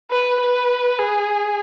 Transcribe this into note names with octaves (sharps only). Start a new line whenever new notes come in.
B4
B4
G#4